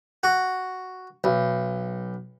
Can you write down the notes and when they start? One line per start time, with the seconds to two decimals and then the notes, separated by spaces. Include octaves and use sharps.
0.23 F#4
1.24 B1